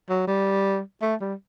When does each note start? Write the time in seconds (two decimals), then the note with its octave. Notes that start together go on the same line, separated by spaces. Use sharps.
0.09 F#3
0.27 G3
1.02 A3
1.21 G3